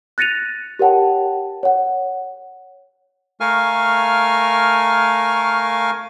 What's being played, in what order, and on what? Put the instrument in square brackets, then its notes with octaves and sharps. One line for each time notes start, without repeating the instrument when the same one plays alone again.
[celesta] F#6 A6 A#6 C#7 D#7 F7
G4 A#4 C#5 F#5 G5 A5
C#5 F#5
[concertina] A3 A#4 F5 G#5 C#6 F6